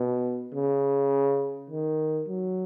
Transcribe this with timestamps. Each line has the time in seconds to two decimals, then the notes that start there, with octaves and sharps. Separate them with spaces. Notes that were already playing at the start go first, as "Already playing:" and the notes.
Already playing: B2
0.54 C#3
1.70 D#3
2.28 F#3